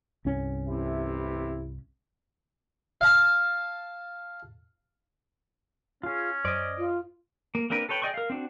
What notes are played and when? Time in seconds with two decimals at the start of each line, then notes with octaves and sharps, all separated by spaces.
0.25 C2 G2 C#4
0.68 A1 C3 E4
3.01 F5 A5
6.03 C#4 F4 G#4
6.45 F#2 C5 D5 D#5 D7
6.78 F4
7.55 A#3
7.70 A#3 C4 D4 A#4 B4
7.89 A4 B4 C#5 G5 B5
8.02 G#4 D5 D#5 G5 C#6
8.14 A#4 F5
8.30 C4 D4 F#4